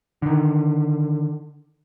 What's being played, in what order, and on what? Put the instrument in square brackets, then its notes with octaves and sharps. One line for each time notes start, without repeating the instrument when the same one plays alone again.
[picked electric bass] D3 D#3